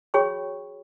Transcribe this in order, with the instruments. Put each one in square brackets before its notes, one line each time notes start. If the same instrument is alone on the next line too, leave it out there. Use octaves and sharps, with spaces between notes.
[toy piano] F#4 G#4 C#5 G5 B5 C#6